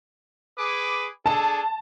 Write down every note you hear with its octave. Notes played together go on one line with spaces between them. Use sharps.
G#4 B4 D6
D4 G#4 A4 A5